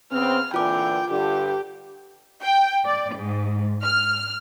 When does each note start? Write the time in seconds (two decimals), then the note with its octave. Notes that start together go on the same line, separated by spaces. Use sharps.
0.12 C#3 B3 C4 F6
0.54 A#2 D3 E3 F4 G5 D6
1.11 G2 D3 G4
2.43 G5
2.85 D5
3.16 G#2
3.84 F6